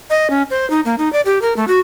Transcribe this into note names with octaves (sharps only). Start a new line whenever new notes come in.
D#5
C#4
C5
D#4
A#3
D#4
D5
G4
A#4
A3
F#4